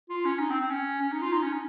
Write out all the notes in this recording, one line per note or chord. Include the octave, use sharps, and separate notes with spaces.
F4
C#4
D#4
C4
C4
C#4
C#4
D#4
F4
D#4
C#4
D#4